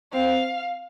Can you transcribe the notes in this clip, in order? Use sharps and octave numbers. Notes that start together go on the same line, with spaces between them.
C4 F5